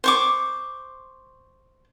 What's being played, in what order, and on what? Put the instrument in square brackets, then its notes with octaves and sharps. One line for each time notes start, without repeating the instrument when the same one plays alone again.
[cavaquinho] C5 C#6 D6